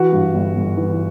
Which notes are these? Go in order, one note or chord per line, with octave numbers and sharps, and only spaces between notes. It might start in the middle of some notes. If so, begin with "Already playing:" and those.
Already playing: E3 F#4
G2
G1
G1
E3